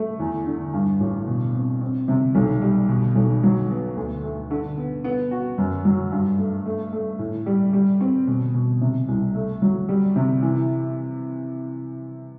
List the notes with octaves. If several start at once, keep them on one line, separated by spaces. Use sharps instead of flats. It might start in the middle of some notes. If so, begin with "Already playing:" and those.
Already playing: A3
E2
D3
G2
A1
B2
C4
C4
C3
B1
G3
B2
B1
F#3
B3
D2
A3
D3
B3
B3
F#4
F#2
F#3
G2
A3
A3
A3
A2
G3
G3
C4
B2
B2
C3
C2
A3
F#3
G3
C3
E3